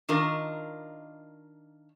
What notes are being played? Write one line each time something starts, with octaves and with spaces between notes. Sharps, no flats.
D#3 D4 F4 A#4 D#5